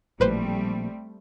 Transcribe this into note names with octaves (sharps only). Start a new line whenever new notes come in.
A1 A#2 F3 G3 A3 C4 B4 C5